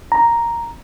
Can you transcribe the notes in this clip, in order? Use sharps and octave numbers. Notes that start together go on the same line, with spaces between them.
A#5